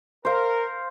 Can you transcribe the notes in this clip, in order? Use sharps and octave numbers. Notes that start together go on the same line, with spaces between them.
A#4 C5 F5